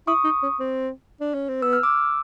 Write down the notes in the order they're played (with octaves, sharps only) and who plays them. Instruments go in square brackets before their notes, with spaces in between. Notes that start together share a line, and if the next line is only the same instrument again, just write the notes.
[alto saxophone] E4 [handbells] C#6 D#6
[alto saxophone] D#4
C#4
C4
D4
C#4
C4
[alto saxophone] B3 [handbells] E6
[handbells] F6
D6 E6